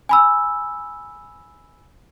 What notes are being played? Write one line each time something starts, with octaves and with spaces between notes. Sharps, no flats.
G#5 B5 E6